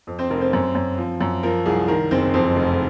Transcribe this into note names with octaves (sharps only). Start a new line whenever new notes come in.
F2
C4 C5
F1 A#4
C4 C5
F#2
F#2
F3
F#2
F3 A#4
C2 G#4
D#3 A#4
F#1 C4 C5
F2 C4 C5
F1